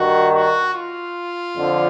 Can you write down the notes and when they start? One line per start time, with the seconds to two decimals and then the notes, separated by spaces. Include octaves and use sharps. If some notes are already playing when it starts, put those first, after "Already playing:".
Already playing: G2 D#3 F#4
0.33 F#4
0.74 F4
1.55 F2 D3 F3